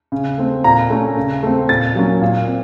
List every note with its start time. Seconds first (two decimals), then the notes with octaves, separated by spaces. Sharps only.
0.12 C#3
0.38 A3 C4
0.64 A#2 A#5
0.90 A3 C#4
1.17 C#3
1.43 A3 C4
1.69 A#2 A6
1.95 F#3 A#3 C#4
2.22 A#2
2.47 C4